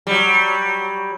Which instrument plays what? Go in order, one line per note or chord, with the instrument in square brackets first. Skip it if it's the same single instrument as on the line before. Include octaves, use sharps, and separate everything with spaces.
[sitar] F#3 G3